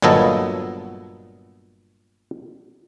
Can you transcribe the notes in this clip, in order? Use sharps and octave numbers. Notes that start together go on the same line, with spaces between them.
G1 A#2 F#3 B3 A4 D#5